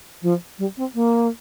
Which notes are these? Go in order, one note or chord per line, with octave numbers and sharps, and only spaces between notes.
F3
G3
C4
A#3